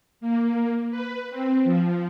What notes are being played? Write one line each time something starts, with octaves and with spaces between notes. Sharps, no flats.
A#3
B4
C4
F3